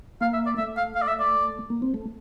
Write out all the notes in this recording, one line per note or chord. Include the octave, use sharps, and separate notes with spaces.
A#3 F5
E5
D5
A3 E5
F5
F5
D5
E5
D5
A#3
C4
A3